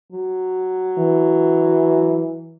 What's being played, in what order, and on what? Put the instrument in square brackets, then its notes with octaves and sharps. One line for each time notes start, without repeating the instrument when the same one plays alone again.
[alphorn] F#3
[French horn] E3